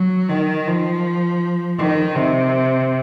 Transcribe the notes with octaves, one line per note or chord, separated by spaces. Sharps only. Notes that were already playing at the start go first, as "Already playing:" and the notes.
Already playing: F#3
D#3
F3
D#3
C3